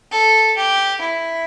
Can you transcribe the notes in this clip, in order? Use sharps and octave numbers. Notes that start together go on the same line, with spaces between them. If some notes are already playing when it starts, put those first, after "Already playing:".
A4
G4
E4